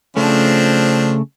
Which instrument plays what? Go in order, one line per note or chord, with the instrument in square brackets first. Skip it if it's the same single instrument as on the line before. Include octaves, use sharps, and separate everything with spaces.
[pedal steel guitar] C#3 A3 [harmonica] F3 C4 D4